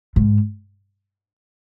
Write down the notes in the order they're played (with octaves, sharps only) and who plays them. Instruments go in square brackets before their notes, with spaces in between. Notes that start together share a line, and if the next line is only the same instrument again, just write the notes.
[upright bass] G#2